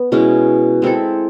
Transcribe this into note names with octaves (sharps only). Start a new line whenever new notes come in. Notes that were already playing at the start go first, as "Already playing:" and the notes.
Already playing: B3
B2 G#3 C#4 E4
G#3 C4 E4 A4